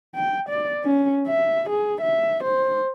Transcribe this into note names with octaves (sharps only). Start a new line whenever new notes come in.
G5
D5
C#4
E5
G#4
E5
C5